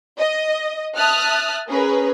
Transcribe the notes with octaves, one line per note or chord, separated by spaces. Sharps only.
D#5
E5 A5 D#6 F6 F#6
C#4 G#4 A#4 B4